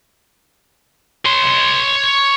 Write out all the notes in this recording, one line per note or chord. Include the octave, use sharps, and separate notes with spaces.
C#5 C6